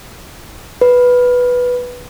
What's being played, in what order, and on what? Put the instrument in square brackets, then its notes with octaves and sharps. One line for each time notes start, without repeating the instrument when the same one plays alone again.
[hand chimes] B4